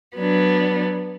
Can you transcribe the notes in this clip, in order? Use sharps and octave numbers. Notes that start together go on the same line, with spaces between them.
F#3 B3 D4